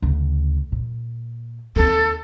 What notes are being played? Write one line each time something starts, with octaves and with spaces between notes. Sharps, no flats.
D2 C#3
A#2
D#2 C4 A4